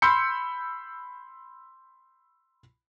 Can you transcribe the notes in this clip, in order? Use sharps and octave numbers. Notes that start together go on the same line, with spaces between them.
B5 C6 E6 G6 C#7